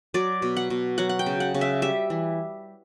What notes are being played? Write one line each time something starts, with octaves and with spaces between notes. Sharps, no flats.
F#3 D5
B2
F#5
B2
F#3 F#5
F#5
G5
C#3
F#5
C#3
E5
G3 E5
E3